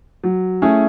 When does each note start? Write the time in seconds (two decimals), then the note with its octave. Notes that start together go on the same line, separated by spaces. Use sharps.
0.24 F#3
0.62 A3 C#4 E4 G#4